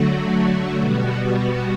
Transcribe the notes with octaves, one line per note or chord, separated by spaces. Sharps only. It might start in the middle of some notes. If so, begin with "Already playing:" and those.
Already playing: D3 F#3 A3 F#4
B2 G3 B3 F#4